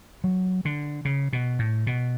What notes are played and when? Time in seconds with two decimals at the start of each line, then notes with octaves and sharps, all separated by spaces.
0.24 F#3
0.65 D3
1.05 C#3
1.33 B2
1.59 A2
1.87 B2